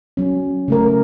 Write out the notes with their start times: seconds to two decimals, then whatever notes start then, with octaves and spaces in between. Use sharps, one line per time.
0.17 F#3 C#4
0.68 C#3 A3 A#4